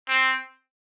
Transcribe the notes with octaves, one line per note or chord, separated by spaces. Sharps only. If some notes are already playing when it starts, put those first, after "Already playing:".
C4